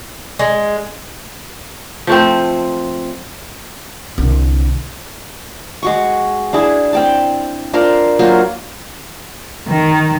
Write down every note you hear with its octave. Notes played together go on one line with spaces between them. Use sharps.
G#3
F3 A3 C4
C2 D3
G#3 F#4 C#6
D4 E4 G#4
C4 G5 A5
D4 F4 A#4 C5
F#3 A#3 F4 C5
D#3